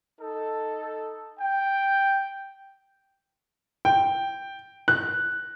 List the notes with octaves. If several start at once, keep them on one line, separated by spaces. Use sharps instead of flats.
D#4 A4
G5
G5
F#6